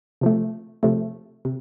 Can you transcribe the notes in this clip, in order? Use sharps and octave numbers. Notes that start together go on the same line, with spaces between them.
C3 F3 A3
C3 F3 A3
C3